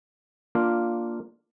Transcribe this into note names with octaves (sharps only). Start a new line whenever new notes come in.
A#3 D4 F4 F5